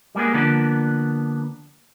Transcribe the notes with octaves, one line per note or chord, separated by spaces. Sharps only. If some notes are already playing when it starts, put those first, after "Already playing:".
G3 G#3 A#3 B3 G#4
D3 F3 A#3 B3 D4